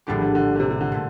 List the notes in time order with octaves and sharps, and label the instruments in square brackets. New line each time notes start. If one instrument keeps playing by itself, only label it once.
[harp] A#1 A2 G3 D4 G4 [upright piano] D3
[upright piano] D3
D3
D3
C3
C3
D3
[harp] A#2 A3